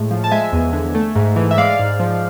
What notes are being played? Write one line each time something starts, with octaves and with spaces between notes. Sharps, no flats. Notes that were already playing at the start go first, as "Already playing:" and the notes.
Already playing: A2 G#3 A3
F3
A5
G#3 E5 G#5
E2
D3
A3
G#2
E3
E5
G#3 D5 F5
G#2
F3